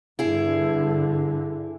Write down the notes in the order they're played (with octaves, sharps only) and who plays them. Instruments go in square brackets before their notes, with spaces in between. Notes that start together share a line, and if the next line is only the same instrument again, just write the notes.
[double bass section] G2 D3 [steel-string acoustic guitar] E4 G#4